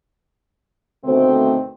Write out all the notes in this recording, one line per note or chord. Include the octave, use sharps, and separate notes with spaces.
D2 B2 D#3 A3 C4 C5